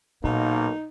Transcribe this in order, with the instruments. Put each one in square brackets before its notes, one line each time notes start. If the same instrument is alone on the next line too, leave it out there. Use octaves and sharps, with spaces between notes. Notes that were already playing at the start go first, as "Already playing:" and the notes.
[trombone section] B1 A#3 [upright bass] A#2 [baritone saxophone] D#4